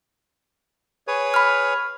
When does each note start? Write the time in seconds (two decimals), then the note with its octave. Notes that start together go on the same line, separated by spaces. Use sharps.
1.07 G#4 B4 C#5
1.34 B5 F6